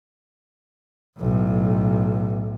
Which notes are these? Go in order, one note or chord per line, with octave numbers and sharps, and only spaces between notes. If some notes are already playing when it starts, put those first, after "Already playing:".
B1 A2